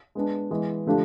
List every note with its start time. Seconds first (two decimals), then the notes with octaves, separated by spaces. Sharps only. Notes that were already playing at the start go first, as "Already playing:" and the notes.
0.15 G#3 B3 D4
0.51 E3 G#3 B3
0.86 D3 F3 A3 D4 G4